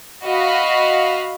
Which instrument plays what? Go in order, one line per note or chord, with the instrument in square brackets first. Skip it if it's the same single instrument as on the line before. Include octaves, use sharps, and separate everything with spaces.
[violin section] F#4 D#5 F5 B5